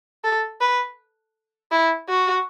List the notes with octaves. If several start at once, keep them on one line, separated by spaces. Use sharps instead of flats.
A4
B4
E4
F#4